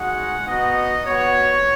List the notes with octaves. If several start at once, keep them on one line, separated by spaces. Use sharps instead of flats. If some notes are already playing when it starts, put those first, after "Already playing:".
Already playing: G#3 D#4 F#4 F#5
B3 D#4 F#4 D#5
B3 F#4 C#5